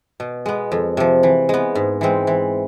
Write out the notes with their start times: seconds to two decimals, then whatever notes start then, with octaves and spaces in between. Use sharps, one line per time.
0.20 B2
0.46 G#3 B3
0.72 F2
0.97 C3 F3
1.23 E3
1.49 G#3 B3
1.75 G#2
2.01 E3 G#3 C4
2.27 E3